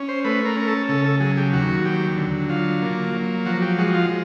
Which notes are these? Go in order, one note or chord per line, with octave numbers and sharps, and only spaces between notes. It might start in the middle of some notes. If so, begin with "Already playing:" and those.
Already playing: C#4
C5
A3 B4
A#4
C#4 A#4
A4
C#3 A4
A4
F#3 G#4
G4
D#2 F#4
F#3 G4
D3
F#3 F4
A#3
F#3
F3 F#4
G4
G#3 F#4
F4